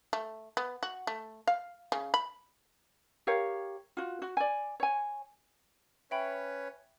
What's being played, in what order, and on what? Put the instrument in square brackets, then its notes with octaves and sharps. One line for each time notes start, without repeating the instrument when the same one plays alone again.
[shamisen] A3
B3
F#4
A3
F5
C#3
B5
[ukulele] G4 A#4 C#5 F5
F4 F#4
F#4
D5 G#5
C#5 G#5
[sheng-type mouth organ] C#4 B4 C#5 [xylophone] E5 G5 B5